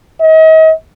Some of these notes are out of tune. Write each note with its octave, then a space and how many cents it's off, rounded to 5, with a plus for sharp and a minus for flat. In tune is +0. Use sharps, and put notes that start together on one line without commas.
D#5 +40